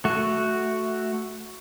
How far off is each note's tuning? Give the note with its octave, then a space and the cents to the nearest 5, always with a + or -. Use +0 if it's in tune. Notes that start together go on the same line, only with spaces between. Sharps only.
A3 +0 F#4 +0